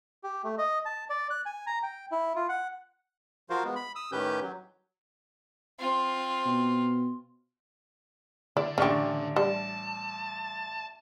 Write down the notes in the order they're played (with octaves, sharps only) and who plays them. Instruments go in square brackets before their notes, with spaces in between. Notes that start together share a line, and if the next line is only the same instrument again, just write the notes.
[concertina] G4
A3
D#5
A5
D5
F#6
G#5
A#5
G5
E4
F4
F#5
[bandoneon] F3 F4 F#4 A#4 C5 F5
G#3 B3
B5
D#6 E6
A2 D#3 C#4 G4 B4 G6
F#3
[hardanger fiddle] C4 F4
[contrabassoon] B2
[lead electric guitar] D3 [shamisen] E4 D5
[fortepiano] A1 D4 C#6 [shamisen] C#4 G4
[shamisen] G3 [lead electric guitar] A5